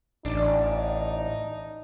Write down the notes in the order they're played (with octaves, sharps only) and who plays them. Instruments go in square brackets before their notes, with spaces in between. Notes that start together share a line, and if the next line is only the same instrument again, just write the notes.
[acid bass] A1 [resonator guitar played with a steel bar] D4 [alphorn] D#4